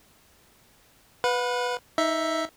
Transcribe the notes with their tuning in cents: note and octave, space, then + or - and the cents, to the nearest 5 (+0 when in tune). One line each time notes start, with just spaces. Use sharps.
B4 +0 F#5 -45
D#4 +20 E5 +0